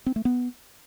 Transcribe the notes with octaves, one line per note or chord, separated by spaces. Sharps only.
C4
A3
B3